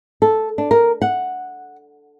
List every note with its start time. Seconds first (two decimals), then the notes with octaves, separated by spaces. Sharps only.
0.22 A4
0.58 D4
0.71 A#4
1.02 F#5